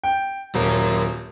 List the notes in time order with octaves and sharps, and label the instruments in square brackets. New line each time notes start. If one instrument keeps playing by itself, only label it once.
[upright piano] G5
[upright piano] D#1 [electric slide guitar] F#3 A#4